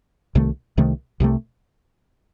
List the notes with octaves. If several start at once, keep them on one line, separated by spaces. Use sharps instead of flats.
C2 C3 D#3 A3
C2 C3 D#3 A3
C2 C3 D#3 A3